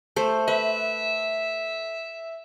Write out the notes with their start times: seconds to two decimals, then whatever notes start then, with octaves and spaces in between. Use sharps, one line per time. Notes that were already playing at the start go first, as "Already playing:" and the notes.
0.16 A3 C5
0.48 B4 E5